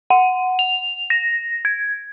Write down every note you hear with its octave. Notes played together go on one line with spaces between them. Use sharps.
F#5
F7
A#6
G#6